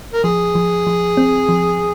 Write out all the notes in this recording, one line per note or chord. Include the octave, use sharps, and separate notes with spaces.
A#4
F3 G#4
F3
F3
C4
F3